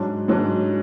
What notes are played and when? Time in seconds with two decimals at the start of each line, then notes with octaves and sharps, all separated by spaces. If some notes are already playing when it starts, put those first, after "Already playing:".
Already playing: G#2 F#3 D4
0.28 G#2 F#3 D4